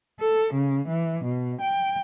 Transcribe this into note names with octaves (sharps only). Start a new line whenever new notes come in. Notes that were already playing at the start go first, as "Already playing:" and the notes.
A4
C#3
E3
B2
G5